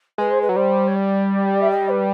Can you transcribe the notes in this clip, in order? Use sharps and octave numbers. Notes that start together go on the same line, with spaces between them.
G#3 B4
C5
B4
F#3
G3 C5
C#5
D5
E5
D#5
B4